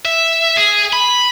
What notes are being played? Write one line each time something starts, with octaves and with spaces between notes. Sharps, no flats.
E5
G#4
B5